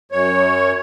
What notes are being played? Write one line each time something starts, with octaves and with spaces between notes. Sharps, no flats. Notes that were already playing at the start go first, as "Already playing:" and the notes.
F#2 C#5